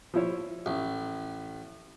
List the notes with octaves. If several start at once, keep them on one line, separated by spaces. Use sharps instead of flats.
F3 E4 C#5
A1